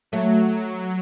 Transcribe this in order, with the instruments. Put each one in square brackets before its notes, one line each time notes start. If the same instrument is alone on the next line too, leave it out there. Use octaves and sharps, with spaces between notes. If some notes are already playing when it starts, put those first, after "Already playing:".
[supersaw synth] F#3 [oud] A3